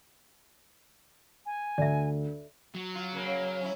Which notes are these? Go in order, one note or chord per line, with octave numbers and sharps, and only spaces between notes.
G#5
D2 D5 E5
F#3
F4
C#3 A#3
C#5
C#4 E4